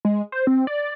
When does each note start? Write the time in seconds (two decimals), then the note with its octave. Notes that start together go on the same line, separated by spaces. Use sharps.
0.05 G#3
0.32 C5
0.47 C4
0.67 D5